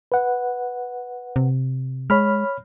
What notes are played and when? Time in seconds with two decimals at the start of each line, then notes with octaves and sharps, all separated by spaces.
0.12 B4 F#5
1.36 C3
2.10 G#3 C#5 B5 F6